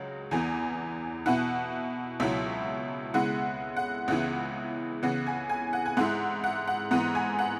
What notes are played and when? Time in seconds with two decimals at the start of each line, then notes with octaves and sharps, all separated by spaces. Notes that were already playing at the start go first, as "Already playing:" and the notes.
Already playing: C#2 C#3 F#3
0.31 E2 E3 B3 G#5
1.26 B2 B3 E4 F#5
2.20 C#2 B2 F#3 E4 E5
3.14 C#3 G#3 B3 E4 F#5
3.76 F#5
4.08 C#2 C#3 E3 B3 E4 F#5
5.03 C#3 E3 B3 F#5
5.27 G#5
5.50 G#5
5.73 F#5
5.86 G#5
5.97 G#2 G#3 E4 F#5
6.44 F#5
6.67 F#5
6.91 G#2 E3 B3 F#5
7.15 G#5
7.39 F#5